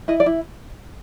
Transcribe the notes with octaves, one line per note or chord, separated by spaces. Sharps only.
E4 D#5
D5
E4